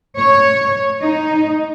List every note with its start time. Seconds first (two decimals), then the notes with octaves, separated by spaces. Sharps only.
0.17 C#5
1.01 D#4